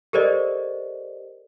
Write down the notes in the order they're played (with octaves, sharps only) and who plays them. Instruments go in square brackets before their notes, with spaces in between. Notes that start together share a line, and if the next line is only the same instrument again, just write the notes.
[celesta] G4 A4 A#4 C5 D5 D#5